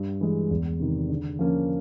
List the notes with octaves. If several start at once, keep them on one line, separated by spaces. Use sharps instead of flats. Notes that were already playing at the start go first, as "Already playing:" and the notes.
Already playing: G2
E3 G#3
E2
C3 D#3
D3
F3 A#3 C#4